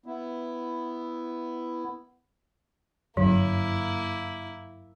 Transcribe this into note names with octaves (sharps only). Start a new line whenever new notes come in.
B3 E4
G1 F#2 F#3 A#3 E4